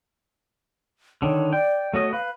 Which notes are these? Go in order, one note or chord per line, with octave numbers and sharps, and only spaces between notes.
D3 D#3 C#5
D5 G5
A3 F#4 C#5 D#5
B4 F5